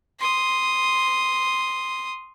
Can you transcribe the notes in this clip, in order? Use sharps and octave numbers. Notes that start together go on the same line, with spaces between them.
C6 D#6